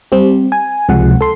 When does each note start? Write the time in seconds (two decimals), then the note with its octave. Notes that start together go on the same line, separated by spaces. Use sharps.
0.12 G3 C4 G4
0.52 G#5
0.88 C#2 C3 F3 G#3 F#5
1.21 A4 C6